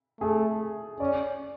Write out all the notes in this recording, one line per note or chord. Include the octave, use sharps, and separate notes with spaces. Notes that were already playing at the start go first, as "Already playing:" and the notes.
A3 G#4
C#4 D5